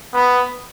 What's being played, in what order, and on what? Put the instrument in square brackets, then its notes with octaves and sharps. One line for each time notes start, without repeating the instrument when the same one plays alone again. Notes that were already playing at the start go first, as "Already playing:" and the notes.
[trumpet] B3